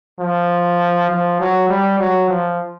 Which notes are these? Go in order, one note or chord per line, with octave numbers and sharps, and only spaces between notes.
F3
F3
F#3
G3
F#3
F3